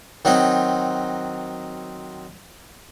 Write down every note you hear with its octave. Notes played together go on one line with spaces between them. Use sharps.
D#3 F#3 C4 D#4